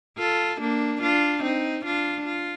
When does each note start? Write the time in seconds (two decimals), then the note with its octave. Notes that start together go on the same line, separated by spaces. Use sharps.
0.18 F4 A4
0.60 A#3 D4
1.02 D4 F4
1.43 C4 D#4
1.85 D4 F4
2.26 F4